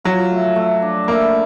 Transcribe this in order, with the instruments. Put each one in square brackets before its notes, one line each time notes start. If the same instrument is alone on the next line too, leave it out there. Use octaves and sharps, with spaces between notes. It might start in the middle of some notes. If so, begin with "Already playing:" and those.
[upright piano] F#3 [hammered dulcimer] F4
[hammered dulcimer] A3
A3
D4
[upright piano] A#3 [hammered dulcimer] E4